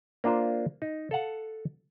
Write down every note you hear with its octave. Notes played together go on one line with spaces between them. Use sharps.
A#3 D4 F4 C5
D#4
A4 F5 F#5 A5